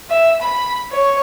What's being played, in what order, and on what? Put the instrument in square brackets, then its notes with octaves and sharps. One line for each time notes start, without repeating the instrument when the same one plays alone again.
[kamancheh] E5
B5
C#5